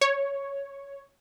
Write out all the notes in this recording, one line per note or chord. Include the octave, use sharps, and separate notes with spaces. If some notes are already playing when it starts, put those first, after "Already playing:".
C#5